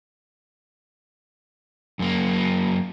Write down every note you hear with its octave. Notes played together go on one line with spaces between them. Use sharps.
F#2 A#3